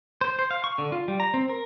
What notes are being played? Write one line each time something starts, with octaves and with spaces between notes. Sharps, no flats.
C5
C5
F5
C#6
D3
F4
G3
A#5
C4
A#4